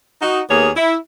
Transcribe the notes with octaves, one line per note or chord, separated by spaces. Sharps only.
D#4 F#4
D#2 A#3 B3 G#4 C#5
E4